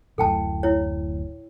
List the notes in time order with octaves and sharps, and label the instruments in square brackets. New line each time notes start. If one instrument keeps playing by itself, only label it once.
[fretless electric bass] D1 F#2 A2 [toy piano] A4 G5 A5
[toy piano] E4 C#5